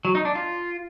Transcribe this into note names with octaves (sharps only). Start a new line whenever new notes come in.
F#3
D#4
D4
F4